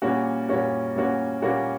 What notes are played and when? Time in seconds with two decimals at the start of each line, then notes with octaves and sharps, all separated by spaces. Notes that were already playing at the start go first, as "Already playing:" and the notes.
0.02 A#2 G3 A#3 C#4 F#4
0.49 A#2 G3 A#3 C#4 F#4
0.95 A#2 G3 A#3 C#4 F#4
1.42 A#2 G3 A#3 C#4 F#4